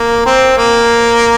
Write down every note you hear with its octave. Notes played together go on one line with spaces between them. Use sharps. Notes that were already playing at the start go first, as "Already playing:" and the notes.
Already playing: A#3
C4
A#3